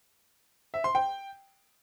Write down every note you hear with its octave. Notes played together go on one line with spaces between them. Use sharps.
E5
C6
G5